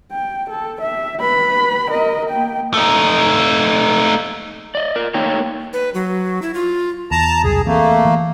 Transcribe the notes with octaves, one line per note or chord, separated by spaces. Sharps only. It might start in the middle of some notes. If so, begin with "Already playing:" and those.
G5
A4
E5
B4 B5
A#4 D#5
A#3 G5
A3 D#4
D5 D#5
A#4 D5
A3 A#3 D#4 C#5 G5 A#5
B4
F#3
E4
F4
E2 A5 A#5
E1 C2 F#2 G#4
E3 A3 A#3 C4
E3